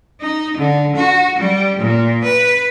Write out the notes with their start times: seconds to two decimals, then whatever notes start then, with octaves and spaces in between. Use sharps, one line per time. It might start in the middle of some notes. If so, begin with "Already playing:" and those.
0.20 D#4
0.57 D3
0.96 F#4
1.39 G3
1.79 A#2
2.24 B4